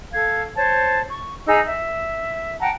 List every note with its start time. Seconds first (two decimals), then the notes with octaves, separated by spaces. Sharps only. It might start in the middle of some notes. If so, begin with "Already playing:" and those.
0.13 A4 F5 G#6
0.55 C5 C#5 A5
1.09 C#6
1.46 D#4 G#4 A#5 E6
1.64 E5
2.60 F#5 G5 A5 A#5